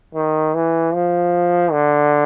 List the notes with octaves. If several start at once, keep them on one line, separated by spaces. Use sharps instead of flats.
D#3
E3
F3
D3